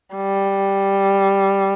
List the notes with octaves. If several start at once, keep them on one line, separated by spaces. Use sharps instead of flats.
G3